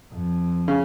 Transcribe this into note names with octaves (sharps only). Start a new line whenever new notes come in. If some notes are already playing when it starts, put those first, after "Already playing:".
F2
C#3